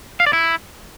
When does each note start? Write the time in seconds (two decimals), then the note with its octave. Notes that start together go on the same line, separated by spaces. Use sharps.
0.20 F5
0.26 D5
0.33 E4